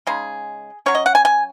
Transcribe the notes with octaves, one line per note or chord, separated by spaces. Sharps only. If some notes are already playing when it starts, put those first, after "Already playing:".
C#3 G#3 D#4 G#4
F#3 C#4 C#5
D#5
F#5
G#5
G#5